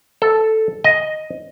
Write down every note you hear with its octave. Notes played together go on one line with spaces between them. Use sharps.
A4
D#5